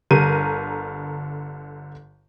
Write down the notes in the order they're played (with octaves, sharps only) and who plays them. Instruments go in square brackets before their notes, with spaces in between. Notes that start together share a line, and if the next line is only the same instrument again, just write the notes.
[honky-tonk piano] G1 D3 A#4 D#7